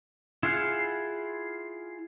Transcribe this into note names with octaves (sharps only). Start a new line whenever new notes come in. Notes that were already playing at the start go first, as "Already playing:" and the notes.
E4 F4 G#4 F5 F#5